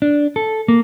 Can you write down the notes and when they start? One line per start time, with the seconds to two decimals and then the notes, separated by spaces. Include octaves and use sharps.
0.02 D4
0.36 A4
0.68 A#3